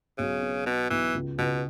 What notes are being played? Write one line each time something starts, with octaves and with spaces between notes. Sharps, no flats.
B1 C#3
B3
B2 B3
B1 E3
C#2
C#2 B2